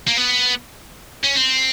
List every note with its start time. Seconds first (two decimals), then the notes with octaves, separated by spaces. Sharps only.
0.08 A#3
0.17 B3
1.24 C#4
1.35 C4